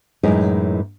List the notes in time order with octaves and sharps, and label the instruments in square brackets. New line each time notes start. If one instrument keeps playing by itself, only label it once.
[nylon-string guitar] F#2 A2 E3 G#3 D#4